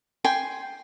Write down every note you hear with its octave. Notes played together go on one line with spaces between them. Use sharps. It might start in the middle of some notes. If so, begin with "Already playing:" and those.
G5 G#5 C6